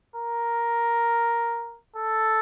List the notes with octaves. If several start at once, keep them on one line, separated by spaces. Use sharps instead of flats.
A#4
A4